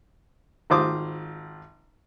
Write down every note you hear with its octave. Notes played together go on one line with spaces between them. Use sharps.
G#1 F4 C5 D6 D#6